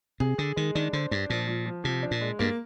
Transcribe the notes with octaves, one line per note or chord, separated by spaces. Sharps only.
C3 G#4
D3 G#4
D#3 G#3
D#3 D4
D3 C5
G2 D4
A#2 F3
F3
F3
C3 F3
D4
A#2
G#3
G2 A#3